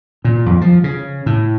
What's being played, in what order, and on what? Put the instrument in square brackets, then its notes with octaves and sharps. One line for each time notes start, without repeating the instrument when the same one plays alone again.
[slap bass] A#2
F2
F3
C#3
A2